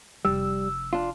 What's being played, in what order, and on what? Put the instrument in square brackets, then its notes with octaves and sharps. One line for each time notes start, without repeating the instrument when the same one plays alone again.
[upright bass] F1 [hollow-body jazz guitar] G3 [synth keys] E6
[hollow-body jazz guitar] D4 F4